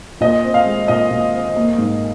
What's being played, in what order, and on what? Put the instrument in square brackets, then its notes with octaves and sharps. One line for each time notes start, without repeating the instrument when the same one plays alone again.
[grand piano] A#2 [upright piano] D#5
[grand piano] C4
[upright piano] F5
[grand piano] G#3
[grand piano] A#2 [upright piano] D#5
[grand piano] A#2
C4
A#3
G#2